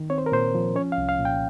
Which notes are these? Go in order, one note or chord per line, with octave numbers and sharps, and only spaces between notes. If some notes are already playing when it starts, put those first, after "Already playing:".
Already playing: D#3
C4 C#5
C5
A#4
A#2 C5
F3
C#4 C#5
F5
C2
F5
A#2
G5